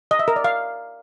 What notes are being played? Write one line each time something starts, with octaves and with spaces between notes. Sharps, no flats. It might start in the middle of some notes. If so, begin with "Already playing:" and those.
D#5
E5
A#4
D5
F5